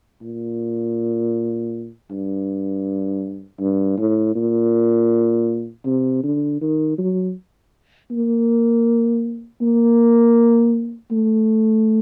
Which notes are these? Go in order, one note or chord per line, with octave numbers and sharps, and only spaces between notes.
A#2
G2
G2
A2
A#2
C3
D3
D#3
F#3
A#3
A#3
A3